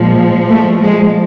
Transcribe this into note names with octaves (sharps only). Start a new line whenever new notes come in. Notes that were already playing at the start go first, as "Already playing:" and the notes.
Already playing: A#2 F3 G#3
A3
G#3